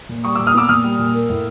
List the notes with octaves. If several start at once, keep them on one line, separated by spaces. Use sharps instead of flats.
A#2
G3 C#6 D#6
A#2 D6 E6
D#6 F6
B3 D6 E6
A#2 D#6 F6
G3
A#2
A#3
A2